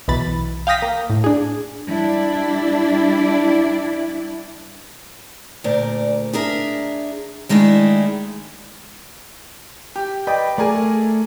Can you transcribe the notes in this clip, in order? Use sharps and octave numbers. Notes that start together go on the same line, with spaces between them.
B1 B2 E3 B5 A6
F5 G5 D#6 A#6 B6
A#3
A2
D4 G#4
G3 D4 E4 D5
D2 A#2 A#4 D5
D4 G#4 A#4 E5
D#3 G#3 A3 D4 E4
G4
B4 D5 D#5 G5
A3 G#4 A#4 D5 G#5